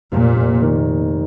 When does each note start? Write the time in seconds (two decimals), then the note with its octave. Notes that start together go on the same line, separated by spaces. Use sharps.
0.11 F1 A#2
0.36 F1
0.62 D#3